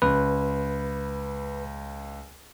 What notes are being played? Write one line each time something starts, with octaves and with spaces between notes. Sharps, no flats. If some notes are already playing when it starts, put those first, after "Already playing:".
C#2 B4